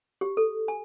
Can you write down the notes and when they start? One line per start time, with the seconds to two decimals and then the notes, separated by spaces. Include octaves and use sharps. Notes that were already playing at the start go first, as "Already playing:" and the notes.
0.21 G4
0.37 A4
0.68 G#5